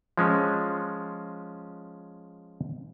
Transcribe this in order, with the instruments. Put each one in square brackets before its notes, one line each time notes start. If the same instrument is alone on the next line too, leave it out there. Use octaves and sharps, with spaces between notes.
[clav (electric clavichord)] F3 G#3 C#4